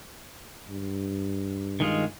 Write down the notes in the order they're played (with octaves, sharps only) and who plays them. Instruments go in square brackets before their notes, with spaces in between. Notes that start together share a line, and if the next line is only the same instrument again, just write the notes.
[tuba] G2
[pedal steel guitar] D#3 G#3 F4